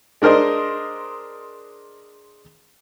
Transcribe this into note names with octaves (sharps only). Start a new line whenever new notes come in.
G#3 D4 A#4 C5 D#5